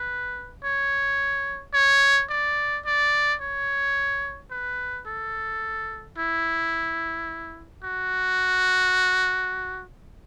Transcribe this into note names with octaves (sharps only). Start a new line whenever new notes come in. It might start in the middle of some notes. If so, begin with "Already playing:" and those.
Already playing: B4
C#5
C#5
D5
D5
C#5
B4
A4
E4
F#4